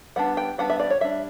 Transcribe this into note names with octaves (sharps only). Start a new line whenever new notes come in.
G3 B3 D4 F#5
G5
G3 B3 D4 F#5
E5
D5
C#5
G3 D4 E5